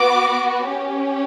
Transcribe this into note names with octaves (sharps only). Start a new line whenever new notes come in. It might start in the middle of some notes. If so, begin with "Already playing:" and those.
Already playing: B3 F#4 D6
C#4 G4